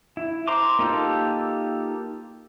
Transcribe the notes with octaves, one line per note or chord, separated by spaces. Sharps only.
E4
C5 A#5 C6 D6
A#3 D#4 F4 G4 A4